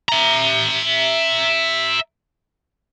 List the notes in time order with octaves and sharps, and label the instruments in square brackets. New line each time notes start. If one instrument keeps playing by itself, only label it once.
[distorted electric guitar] E5 A#5